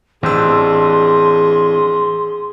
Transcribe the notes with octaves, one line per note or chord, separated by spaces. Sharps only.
A1 E3 C4 D4 G#4 C6 E6